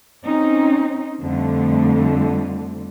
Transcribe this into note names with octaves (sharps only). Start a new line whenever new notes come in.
C4 C#4 D#4
F2 D3 G3 A3